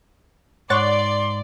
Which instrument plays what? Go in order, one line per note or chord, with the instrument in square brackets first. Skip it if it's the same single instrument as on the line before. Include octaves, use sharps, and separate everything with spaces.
[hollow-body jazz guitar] G#2 [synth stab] C#5 F#5 A6 [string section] D5 [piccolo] C6